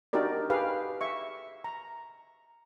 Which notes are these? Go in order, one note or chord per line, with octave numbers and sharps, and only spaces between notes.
D4 D#4 F#4 G4 A#4 D5
G4 G#4 B4 F5
E5 C#6
A#5